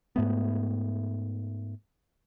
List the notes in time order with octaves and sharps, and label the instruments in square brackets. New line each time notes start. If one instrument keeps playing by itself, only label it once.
[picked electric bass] G#2 A3 B3